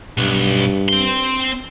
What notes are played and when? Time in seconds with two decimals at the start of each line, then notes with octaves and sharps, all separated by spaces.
0.18 B1 G2
0.89 C4 C6